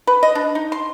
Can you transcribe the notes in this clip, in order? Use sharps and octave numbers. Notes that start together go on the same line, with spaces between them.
B4
D#5
D4
D#4
C6